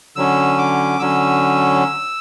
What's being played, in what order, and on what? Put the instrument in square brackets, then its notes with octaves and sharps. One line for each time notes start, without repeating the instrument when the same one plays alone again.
[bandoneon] D3 F#3 C#4 E6
D6
D3 F#3 C#4 E6